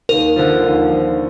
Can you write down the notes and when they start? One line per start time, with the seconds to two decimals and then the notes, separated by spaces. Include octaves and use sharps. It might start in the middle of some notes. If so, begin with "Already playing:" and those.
0.09 D#2 A#4
0.36 D3 F3
0.62 D#2
0.89 D3 F3